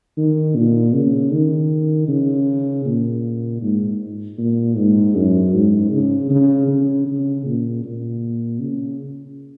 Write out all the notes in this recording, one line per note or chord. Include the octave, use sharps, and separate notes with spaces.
D#3
A#2
C#3
D#3
C#3
A#2
G#2
A#2
G#2
F#2
G#2
C#3
C#3
C#3
C#3
A#2
A#2
C#3